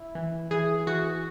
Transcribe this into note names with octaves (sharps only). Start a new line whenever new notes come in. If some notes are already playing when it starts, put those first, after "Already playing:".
Already playing: E4
E3
E3 G#4
E3 F#4